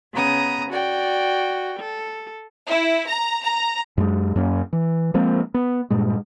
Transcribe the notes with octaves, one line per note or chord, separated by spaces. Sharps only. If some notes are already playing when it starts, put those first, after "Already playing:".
C#3 B3 A#5 D#6
F#4 D5 G5
A4
E4
A#5
A#5
F#2 G#3
F#2 A#3 C#4
E3
F3 G#3 A#3 C4
B3
G2 A#2 G#3